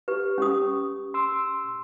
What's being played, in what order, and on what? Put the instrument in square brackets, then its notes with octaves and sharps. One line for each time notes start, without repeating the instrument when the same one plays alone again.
[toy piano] G4 B4
C#4 G4 D#6
[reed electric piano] C6 E6